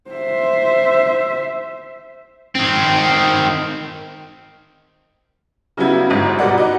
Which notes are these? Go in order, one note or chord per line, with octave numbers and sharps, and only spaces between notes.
C5 E5
D#3 C4
C#3 F#3 G3 B3 E4 G#6
G1 G#2
B2 G3 A#4 D5 F#5
D#4 F#4